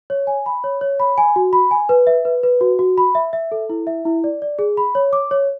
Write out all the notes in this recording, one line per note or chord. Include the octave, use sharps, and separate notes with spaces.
C#5
G#5
B5
C#5
C#5
B5
G#5
F#4
B5
G#5
B4
E5
B4
B4
F#4
F#4
B5
E5
E5
A4
E4
E5
E4
D5
D5
G#4
B5
C#5
D6
C#5